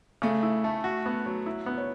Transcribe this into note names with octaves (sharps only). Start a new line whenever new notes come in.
C#3 A3
E4
A3
F#4
B3
F#3
E4
B3
C#5